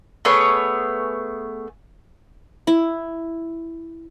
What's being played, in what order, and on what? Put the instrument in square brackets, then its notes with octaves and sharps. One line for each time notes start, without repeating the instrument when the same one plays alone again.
[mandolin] A3 B3 G#4 C#5
[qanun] E4